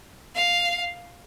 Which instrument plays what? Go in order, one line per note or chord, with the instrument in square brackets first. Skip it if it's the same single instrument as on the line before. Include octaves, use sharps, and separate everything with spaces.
[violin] F5